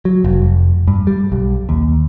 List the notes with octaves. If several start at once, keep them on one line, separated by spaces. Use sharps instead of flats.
F#3
F1
G2
G3
B1
D#2